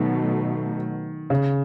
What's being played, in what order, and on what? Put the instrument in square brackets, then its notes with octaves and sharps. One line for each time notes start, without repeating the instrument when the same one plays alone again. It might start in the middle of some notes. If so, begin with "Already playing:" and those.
Already playing: [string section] B2 F#3 A3 [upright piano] D#3
[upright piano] C#3